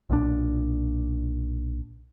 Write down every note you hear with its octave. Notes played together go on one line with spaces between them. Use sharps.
B1 A#2 C#3 D4